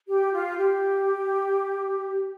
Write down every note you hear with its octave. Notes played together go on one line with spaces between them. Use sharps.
G4
F4
G4